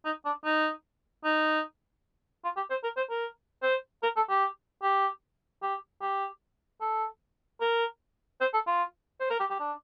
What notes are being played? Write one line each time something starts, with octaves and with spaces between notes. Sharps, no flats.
D#4
D4
D#4
D#4
F4
G4
C5
A#4
C5
A#4
C5
A#4
A4
G4
G4
G4
G4
A4
A#4
C5
A4
F4
C5
A#4
G4
G4
D4